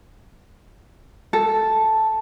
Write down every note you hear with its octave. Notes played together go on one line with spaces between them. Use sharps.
A4